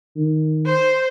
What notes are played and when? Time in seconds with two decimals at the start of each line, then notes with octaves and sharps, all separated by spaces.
0.16 D#3
0.66 C5